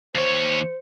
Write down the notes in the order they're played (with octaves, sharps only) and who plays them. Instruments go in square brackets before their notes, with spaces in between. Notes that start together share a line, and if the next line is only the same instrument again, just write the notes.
[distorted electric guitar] D#2 C#5 [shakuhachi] C5